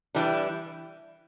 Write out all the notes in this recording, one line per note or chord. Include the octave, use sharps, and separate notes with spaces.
E3 G3 D4